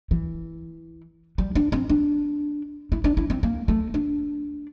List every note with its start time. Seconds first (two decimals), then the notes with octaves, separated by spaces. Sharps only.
0.11 E3
1.38 G3
1.55 D4
1.72 C4
1.89 D4
2.92 E4
3.04 D4
3.17 E4
3.30 C4
3.43 A#3
3.68 A3
3.94 D4